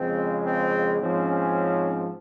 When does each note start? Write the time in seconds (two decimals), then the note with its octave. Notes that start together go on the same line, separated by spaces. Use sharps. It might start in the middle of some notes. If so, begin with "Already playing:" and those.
Already playing: F2 C#3 G#3 C4
0.45 C4
0.99 G#2 F3 C4 C#4